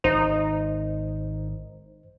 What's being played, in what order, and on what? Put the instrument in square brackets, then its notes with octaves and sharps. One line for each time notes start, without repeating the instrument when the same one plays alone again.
[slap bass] G#1 [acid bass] D#4 [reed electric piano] C5